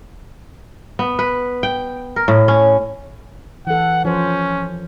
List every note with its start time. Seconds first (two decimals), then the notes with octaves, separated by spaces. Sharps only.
0.99 B3
1.19 B4
1.63 G5
2.16 A#4
2.28 A2
2.48 C#4
3.67 E3 A4 F#5
4.05 F3 C#4 C5